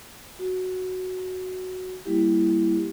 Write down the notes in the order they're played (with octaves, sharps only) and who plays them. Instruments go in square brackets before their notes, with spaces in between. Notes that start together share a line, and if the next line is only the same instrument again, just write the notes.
[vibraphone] F#4
G3 A#3 E4 G4